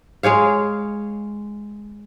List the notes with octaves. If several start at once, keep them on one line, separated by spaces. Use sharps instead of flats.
G#3 G#4 C#5 F5